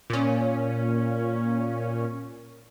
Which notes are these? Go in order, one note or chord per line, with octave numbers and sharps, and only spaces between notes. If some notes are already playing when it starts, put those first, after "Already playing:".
A#2 C#4